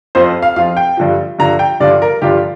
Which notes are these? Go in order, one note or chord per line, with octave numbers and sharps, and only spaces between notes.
F2 F3 C4 F4 C5
F5
F2 F3 C4 F4 F5
G5
G2 D3 F3
G2 D3 F3 A#5
G5
G2 D3 F3 D4 F4 D5
A#4
G2 D3 F3 D4 F4 G4